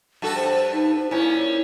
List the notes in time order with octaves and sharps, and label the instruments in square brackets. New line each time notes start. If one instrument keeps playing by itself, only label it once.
[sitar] G2 F#4 A4
[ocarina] C5
D#4
C5
[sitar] A#2 C#4 [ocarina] E4